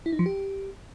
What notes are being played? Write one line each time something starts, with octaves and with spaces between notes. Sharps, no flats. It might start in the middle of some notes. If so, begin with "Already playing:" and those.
E4
D#4
F3
G4